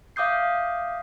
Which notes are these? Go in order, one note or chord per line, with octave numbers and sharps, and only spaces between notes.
E5 F5 D6 D#6 G6 C7